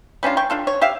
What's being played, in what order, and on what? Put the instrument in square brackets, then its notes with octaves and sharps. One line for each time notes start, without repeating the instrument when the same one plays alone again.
[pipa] G3 C#4 D4 F4
G5 C#6
D4 F4 A4
C#5
G4 E5 F5